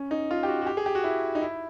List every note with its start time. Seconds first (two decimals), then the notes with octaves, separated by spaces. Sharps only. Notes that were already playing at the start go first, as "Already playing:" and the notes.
Already playing: C#4
0.11 D#4
0.31 F4
0.43 G4
0.48 F#4
0.62 F#4
0.67 G4
0.77 G#4
0.86 G4
0.95 F#4
1.04 E4
1.35 D#4
1.42 E4